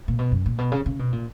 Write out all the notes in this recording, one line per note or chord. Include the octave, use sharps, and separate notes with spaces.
A#2
B2
F#2
A#2
B2
C#3
C#3
B2
A#2